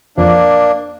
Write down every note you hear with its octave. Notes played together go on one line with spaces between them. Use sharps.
F2 A#3 D4